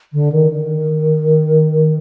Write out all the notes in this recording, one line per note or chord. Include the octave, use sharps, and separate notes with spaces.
D3
D#3
D#3